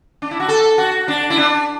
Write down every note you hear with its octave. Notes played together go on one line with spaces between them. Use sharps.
D4
E4
F#4
A4
F#4
D4
E4
D4